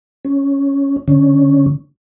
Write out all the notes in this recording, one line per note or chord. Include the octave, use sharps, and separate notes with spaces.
C#4
D3 C#4